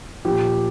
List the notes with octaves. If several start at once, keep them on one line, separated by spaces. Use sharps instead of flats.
A#2 F3 G4